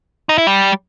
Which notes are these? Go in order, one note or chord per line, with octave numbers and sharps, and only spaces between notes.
D#4
E4
G3